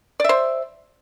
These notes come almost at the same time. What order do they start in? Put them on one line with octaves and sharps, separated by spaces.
D5 E5 C5